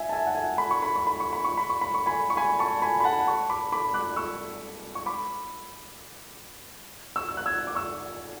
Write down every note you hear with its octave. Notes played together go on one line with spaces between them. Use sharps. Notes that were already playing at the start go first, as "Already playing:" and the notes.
Already playing: E5 G#5
A5
E5 G#5
F#5
E5 G#5
B5
C#6
B5
C#6
B5
C#6
B5
C#6
B5
C#6
B5
C#6
G#5 B5
C#6
G#5 B5
A5 C#6
G#5 B5
B5
F#5 A5
A5 C#6
B5 D6
B5 D6
D6 F#6
C#6 E6
C#6
B5 D6
C#6 E6
E6
F#6
E6 G#6
D6
C#6 E6